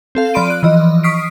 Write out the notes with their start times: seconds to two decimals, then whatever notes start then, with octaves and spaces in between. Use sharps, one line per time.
0.15 C4 A4 F5
0.34 F3 D5 B5 C6 D7 D#7
0.50 F#6
0.63 E3 F3 D#5
1.03 C#6 D#6 F6 B6 C7 D7